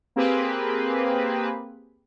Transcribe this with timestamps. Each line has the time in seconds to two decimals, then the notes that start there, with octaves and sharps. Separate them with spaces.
0.16 A#3 C4 G4 G#4 B4